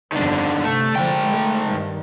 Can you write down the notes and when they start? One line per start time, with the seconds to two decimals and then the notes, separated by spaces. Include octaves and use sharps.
0.12 G1 F2 D#3 D4
0.64 C3 A3
0.96 G#2 D3 F3 G5
1.26 A3
1.64 G2 D#3